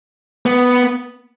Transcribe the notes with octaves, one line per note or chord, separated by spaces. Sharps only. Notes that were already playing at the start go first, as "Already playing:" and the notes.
B3